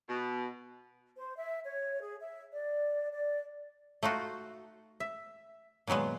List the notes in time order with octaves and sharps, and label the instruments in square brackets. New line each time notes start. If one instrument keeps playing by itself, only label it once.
[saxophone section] B2
[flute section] C5
E5
C#5
G#4
E5
D5
D5
[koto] A3 D#4 F4 F#4
E5
A#2 D#3 F#3 G#3 B3